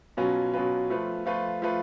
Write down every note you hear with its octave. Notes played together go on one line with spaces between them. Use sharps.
B2 F#3 C#4 F4 B4
B2 F#3 C#4 F4 B4
F3 A3 F4 B4
F3 A3 F4 B4
F3 A3 F4 B4